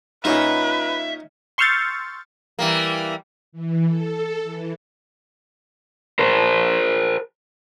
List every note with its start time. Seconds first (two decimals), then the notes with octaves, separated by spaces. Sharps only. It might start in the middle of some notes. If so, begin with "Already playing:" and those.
0.25 A#2 C#4 D#4 F4 B4 E5
1.58 C6 C#6 E6 F6 G6 A6
2.59 E3 G3 A#3
3.52 E3
3.85 A4
4.44 E3
6.19 A#4 C5